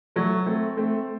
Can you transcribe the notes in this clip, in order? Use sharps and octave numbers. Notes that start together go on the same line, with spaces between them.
F#3 A3
A3 C4
A3 C4